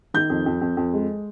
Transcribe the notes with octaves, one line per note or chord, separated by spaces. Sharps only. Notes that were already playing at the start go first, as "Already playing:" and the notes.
D#3 G6
F2
F2
F2
F2
G#3